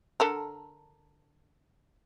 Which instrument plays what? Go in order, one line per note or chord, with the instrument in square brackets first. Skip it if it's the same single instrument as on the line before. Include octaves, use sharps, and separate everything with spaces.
[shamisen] D3 A4 A#4